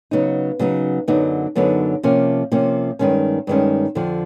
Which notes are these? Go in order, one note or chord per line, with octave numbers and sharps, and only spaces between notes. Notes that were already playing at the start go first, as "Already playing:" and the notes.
C#3 F#3 B3 D#4
C#3 F#3 B3 D#4
F#2 D3 F#3 B3 D#4
F#2 D3 F#3 B3 D#4
C3 F3 A#3 C#4
C3 F3 A#3 C#4
G2 D#3 G#3 C#4
G2 D#3 G#3 C#4
F2 D3 F3